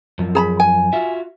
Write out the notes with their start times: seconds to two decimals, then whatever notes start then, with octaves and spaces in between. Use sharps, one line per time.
0.19 F#2 F3
0.35 G#4 A#5 B5
0.60 G#5
0.93 F4 F#4 E5